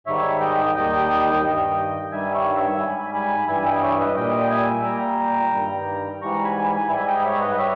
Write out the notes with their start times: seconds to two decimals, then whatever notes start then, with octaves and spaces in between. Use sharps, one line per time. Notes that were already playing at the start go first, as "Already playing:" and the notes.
0.07 G#2 D#3 G3 C#5 E5
0.40 D#5 G5
0.75 D#2 D#3 G3 D#5 G5
1.43 G2 D#3 G3
2.11 G2 D#3 G3 E5 G#5
2.34 C#5 E5
2.57 C#5 E5
2.79 G#2 G3 G#5 B5
3.14 G#5 B5
3.48 G2 E3 G3 E5 G#5
3.65 D#5 G5
3.82 C#5 E5
4.00 B4 D#5
4.16 A#2 G3 D#5 G5
4.50 E5 G#5
4.85 A#2 G3 G5 A#5
5.53 G2 D#3 G3
6.21 G#2 E3 G3 A#5 C#6
6.44 G#5 B5
6.67 G#5 B5
6.90 G#2 G3 E5 G#5
7.07 D#5 G5
7.25 C#5 E5
7.41 B4 D#5
7.58 G3 C#5 E5